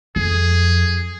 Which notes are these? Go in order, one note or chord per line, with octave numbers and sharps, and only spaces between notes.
F2 G#4